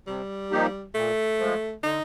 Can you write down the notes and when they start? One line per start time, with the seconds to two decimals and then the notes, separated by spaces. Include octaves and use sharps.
0.07 C3 G3
0.51 F3 A#3 D#4 G4
0.95 A#2 A3
1.39 F3 G#3
1.83 D3 D#4